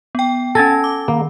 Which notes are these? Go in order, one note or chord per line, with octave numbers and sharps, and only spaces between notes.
B3 G5
C#4 A4 G#5 A5 A#6
D6
D#3 A#3